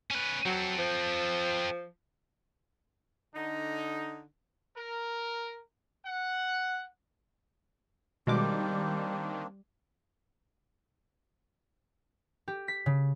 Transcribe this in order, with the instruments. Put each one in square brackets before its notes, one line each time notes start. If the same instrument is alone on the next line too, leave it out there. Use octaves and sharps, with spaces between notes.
[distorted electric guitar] C#4 B4
[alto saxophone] F#3 [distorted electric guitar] C4 A4
[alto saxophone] F3
[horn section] D3 D#4
[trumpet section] A#4
F#5
[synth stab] B2 G#3 D6 [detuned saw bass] D#3 [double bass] G3 [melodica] A#3 C4 D4
[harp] G4
B6
C#3